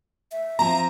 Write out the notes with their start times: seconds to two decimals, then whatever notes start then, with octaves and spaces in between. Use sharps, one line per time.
0.32 E5
0.59 F3 C4 A#5